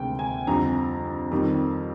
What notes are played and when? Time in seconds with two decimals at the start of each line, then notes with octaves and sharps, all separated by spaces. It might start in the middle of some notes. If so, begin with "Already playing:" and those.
Already playing: D2 C3 D#3 G#3 G5
0.19 G#5
0.47 F2 D3 G3 A#5
1.31 F2 D#3 G3